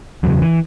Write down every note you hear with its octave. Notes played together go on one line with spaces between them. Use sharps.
E2 C#3 F#3
E3